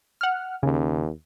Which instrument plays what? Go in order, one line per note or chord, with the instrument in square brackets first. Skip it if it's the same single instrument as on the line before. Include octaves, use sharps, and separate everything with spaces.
[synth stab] F#5 F6
[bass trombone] D#2 [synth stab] C#3